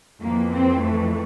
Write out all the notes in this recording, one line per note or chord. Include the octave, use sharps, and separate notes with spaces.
F2 E3 A#3
C4
A3